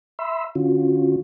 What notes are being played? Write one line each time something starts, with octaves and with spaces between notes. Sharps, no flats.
E5 B5 C6 E6
D3 C#4 F4 F#4